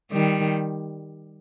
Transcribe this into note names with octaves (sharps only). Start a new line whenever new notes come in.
D#3 G3